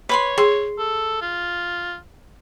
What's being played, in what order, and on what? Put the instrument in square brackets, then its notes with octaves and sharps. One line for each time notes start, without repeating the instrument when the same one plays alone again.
[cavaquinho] B4 B5 C6 [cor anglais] C#5
[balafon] G#4 [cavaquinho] C6
[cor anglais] A4
F4